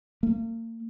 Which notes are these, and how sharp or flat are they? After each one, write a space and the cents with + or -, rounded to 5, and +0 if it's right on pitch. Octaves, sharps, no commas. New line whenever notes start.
A#3 -40